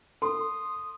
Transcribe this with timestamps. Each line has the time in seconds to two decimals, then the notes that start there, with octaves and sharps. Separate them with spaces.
0.22 A4 C6 D#6